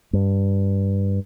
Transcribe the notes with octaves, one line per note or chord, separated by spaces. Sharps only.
G2